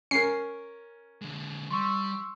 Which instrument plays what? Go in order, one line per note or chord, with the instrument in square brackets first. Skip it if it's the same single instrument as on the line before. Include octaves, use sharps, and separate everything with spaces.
[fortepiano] C#4 A#4 [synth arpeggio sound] C7
[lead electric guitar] D3 G#3
[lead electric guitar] G3 [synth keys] C6 C#6 E6